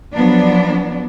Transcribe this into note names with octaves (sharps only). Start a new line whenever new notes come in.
F3 F#3 B3 D4